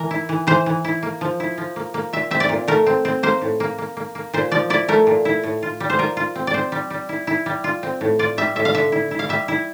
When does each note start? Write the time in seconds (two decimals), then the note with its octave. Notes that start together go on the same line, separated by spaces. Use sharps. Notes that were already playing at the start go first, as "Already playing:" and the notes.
Already playing: E3 A#4
0.11 E4
0.29 E3
0.47 E3 C5
0.66 E3
0.85 E4
1.03 A#3
1.21 F3
1.40 E4
1.58 F3
1.76 A#3
1.94 A#3
2.13 A#2 E5
2.31 C4 E5
2.40 D5
2.49 A#2
2.68 A3 A#4
2.86 C4
3.05 C4
3.23 A#3 C5
3.41 A2
3.60 A#3
3.78 A#3
3.97 A#3
4.15 A#3
4.34 A#2 C5
4.52 F3 D5
4.70 E4 D5
4.88 A3 A#4
5.07 A#2
5.25 E4
5.44 A2
5.62 F4
5.80 G3
5.90 C5
5.99 F4 A#4
6.17 F4
6.35 C4
6.47 D5
6.54 C4 C5
6.72 G3
6.90 G3
7.09 E4
7.27 E4
7.46 G3
7.64 F4
7.83 C4
8.01 A2
8.19 F4 D5
8.38 G3 E5
8.56 A2 E5
8.65 F5
8.74 D3 E5
8.92 E4
9.11 E4
9.19 F5
9.29 G3 E5
9.48 E4